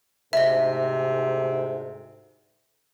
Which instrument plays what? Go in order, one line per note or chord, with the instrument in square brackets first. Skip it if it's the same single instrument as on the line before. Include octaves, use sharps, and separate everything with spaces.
[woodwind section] D2 G#2 [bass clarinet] C3 [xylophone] D#5 E5